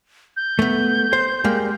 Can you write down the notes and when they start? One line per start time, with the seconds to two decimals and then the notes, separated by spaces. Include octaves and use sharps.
0.37 G6
0.59 A3 B3
1.13 C5
1.44 G3 G#3 A#3